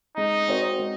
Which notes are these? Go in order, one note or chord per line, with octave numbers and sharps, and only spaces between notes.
G#3 D#4
C4 F#4 A#4 C#5
G#3